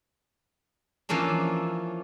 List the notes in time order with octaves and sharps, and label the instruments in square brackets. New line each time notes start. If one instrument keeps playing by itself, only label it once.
[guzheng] E3 F3 A#3 C#4 D4